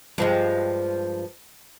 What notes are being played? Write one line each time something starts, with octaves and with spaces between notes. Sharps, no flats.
G2 F3 G#3